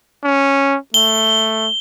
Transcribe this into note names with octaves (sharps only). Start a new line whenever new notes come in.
C#4
A3 G7